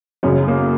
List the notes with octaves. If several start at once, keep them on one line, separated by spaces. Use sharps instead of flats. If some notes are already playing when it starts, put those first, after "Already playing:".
F#2 C#3 C#4
A#3